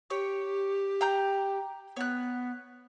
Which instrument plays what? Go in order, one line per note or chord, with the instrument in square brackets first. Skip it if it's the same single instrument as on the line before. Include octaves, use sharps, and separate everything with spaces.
[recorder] G4 [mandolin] C#5
[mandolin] G5 A#5 G6
[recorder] B3 [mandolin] C#5 F#6